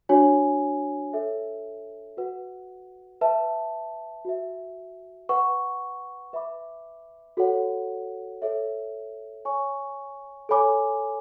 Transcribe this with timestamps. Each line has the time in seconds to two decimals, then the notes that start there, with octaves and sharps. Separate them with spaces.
0.09 D4 F#4 C#5 G#5
1.13 A4 C#5 E5
2.17 F#4 B4 F#5
3.21 B4 E5 A5
4.25 F#4 B4 E5
5.29 B4 F#5 C#6
6.33 B4 E5 B5 D6
7.37 F#4 A4 C#5 F#5
8.42 A4 C#5 E5
9.45 C#5 G#5 C#6
10.49 A4 C#5 G#5 B5 D6